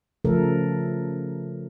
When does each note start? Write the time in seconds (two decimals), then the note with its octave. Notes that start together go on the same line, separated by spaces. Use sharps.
0.25 C#3 F3 A3 A4 A#4